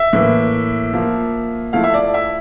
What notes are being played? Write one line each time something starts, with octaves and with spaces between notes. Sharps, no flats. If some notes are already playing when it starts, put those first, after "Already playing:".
Already playing: E5
A2 E3 A#3
F3 A#3 F4
F3 A3 E4 F5
E5
D5
E5